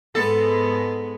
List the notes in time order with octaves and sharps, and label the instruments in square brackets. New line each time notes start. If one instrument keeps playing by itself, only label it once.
[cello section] G#2 G#3 B3 [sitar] A4